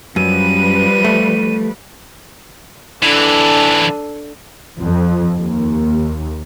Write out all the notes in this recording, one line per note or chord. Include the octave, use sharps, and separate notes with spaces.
F#2 F3 G3 B4 D#7
A3
D3 E3 D4 A4
F2
D#2